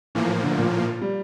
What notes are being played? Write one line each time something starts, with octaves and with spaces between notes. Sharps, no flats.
A2 E3 F3 A#3
D3
A#2
G3